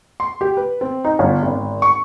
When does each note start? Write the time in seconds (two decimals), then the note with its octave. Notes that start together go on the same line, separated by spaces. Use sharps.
0.20 C6
0.41 G4
0.57 B4
0.81 C4
1.05 D#4
1.19 G1
1.43 G#1
1.82 C#6